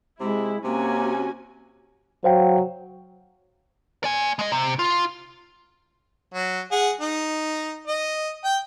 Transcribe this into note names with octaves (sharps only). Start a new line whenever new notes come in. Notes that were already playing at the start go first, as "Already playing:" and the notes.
C3 G#3 E4
C3 A#3 C#4 F#4 G#5
F#3 C5 F5 G5
D5 G#5
G#3 D#5
C3
F4
F#3
G#4 F#5
D#4
D#5
G5